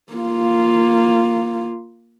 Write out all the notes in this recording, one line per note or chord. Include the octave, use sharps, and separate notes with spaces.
A#3 F4